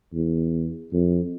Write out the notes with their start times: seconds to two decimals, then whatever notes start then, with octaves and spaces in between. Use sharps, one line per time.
0.14 E2
0.93 F2